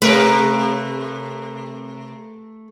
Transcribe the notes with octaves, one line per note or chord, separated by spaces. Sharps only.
C3 A3 A#4 B4